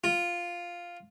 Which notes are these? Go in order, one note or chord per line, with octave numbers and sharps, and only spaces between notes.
F4